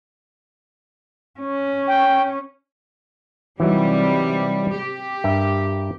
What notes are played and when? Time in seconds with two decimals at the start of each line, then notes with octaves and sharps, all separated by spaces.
1.40 C#4
1.87 G5
3.60 C3 E3 F#3 G3 D#4
4.79 G4
5.24 G2 A#4 E5